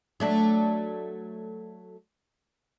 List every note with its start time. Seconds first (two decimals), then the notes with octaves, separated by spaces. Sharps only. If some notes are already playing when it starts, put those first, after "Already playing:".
0.20 F#3 A3 D4